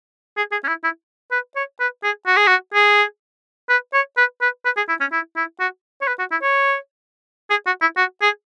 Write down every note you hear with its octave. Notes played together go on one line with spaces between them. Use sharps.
G#4
G#4
C#4
E4
E4
B4
C#5
B4
G#4
F#4
G#4
F#4
G#4
B4
C#5
B4
B4
B4
G#4
E4
C#4
E4
E4
F#4
C#5
B4
F#4
E4
C#5
G#4
F#4
E4
F#4
G#4